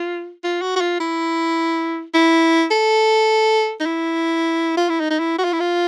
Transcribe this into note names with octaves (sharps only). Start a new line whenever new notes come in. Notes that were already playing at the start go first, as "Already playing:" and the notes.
Already playing: F4
F4
F#4
F#4
F4
E4
E4
A4
D#4
E4
F4
E4
D#4
D#4
E4
F#4
F4
E4
F4